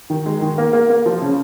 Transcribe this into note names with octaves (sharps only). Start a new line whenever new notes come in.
D#3
G#3
D#3
A#3
A#3
A#3
F3
C#3